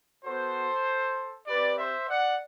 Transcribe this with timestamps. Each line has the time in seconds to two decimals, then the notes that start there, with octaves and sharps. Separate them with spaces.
0.24 B3 F#4 A4 C5
1.47 C4 G4 B4 D5
1.78 C5 E5
2.09 D5 F#5